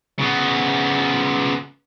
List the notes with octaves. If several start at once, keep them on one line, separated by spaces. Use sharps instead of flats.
C#3 B3